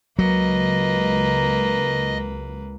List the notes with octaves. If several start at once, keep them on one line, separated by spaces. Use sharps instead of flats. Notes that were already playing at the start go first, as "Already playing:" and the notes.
C#2 F#3 A#3 B4 D#5